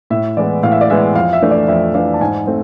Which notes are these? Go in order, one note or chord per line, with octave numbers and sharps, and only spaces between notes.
A2 E5
E3 G#3 B3 D5
A2 F5
E5
D5
E3 G#3 B3 E5
F2 F5
E5
E3 A3 D4
D5
F2 E5
E3 A3 D4 F5
A5
G#2 G#5
A3 C4